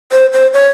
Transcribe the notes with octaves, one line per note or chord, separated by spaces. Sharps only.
C5
C5
C#5